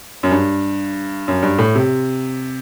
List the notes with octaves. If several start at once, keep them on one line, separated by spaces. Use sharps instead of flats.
F#2
G2
F#2
G2
A2
C3